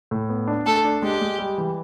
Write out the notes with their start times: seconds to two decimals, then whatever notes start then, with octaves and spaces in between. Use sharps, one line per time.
0.11 A2
0.29 B3
0.47 D4
0.66 A3 A4
0.84 D4
1.02 G#3 G4
1.21 G#3
1.39 G3
1.58 E3